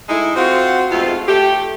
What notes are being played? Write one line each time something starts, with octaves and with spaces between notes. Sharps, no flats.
G#3 A3 D#4 E4
C4 F4 F#4
F2 G#2 B2 A3 F4
A3 G4